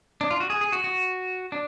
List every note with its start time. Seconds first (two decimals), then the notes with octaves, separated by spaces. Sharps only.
0.21 D4
0.31 F4
0.40 F#4
0.50 G#4
0.61 G#4
0.72 F#4
0.84 F#4
1.52 D4